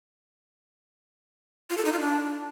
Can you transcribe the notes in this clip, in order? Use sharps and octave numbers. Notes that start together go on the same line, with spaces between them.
F4
A4
D#4
F4
D4